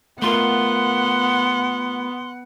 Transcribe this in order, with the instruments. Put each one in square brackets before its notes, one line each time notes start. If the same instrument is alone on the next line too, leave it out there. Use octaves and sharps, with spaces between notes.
[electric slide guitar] A3 F4 A#4 [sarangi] B3 [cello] F#5 [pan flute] C6